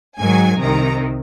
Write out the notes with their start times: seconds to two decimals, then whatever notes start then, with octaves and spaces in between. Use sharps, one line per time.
0.18 G#2 D#3 F#3 G#5
0.59 C2 C3 D#3 A#5